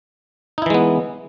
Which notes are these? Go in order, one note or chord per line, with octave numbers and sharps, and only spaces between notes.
E3 G#3 B3 D#4 E4